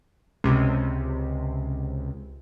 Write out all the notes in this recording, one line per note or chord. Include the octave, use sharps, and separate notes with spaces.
C#2 C3